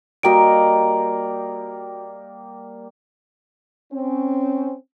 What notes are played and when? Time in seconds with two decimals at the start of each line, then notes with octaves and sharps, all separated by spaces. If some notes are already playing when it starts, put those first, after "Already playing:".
0.23 G3 A#3 F#4 D#5 G5 D7
3.92 C4 C#4